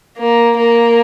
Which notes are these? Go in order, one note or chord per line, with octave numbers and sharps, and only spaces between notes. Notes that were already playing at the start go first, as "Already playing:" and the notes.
A#3
A#3